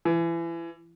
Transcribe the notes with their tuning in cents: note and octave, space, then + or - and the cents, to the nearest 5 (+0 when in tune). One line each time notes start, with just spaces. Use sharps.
E3 +30